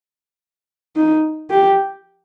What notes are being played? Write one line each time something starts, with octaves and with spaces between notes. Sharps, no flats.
D#4
G4